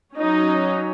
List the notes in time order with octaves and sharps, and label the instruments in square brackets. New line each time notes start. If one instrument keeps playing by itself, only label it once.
[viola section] F#3 C#4 D#4